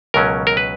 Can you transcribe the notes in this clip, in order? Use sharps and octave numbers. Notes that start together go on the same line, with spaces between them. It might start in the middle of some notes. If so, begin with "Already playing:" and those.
C#2 B2 F#3 C#4 A#4
A#4
B4